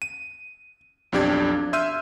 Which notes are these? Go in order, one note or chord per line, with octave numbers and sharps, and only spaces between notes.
D#7
B1 F2 D4 G4 D5 G#6
E5 C6 E6 F6 G6 D#7